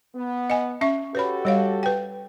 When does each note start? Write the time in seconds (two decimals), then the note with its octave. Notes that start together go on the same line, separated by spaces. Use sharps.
0.15 B3
0.50 D#5 G#5
0.81 C#4 E5 C#6
1.15 F#4 G4 A4 B4 C#5 B5
1.45 G3 C#5 F5
1.83 B4 G5